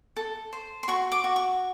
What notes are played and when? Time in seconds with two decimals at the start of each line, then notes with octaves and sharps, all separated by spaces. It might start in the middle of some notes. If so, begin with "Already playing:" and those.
0.16 A4
0.53 C5
0.83 C6
0.88 F#4 C#6
1.12 D6
1.24 F#4
1.36 C#6